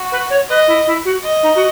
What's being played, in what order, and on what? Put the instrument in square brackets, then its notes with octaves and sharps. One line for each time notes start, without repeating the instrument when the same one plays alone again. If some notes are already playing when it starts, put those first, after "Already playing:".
Already playing: [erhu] F#4
[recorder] B4
C#5
[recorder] B4 [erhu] D#5
[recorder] E4
E4
F#4
[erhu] D#5
[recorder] D#4
F#4